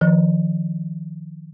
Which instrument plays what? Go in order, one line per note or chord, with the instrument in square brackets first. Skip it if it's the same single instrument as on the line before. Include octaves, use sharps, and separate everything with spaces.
[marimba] D#3 F3